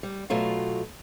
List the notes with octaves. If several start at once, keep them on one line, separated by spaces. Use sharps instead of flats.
G3
B2 F#3 A3 F4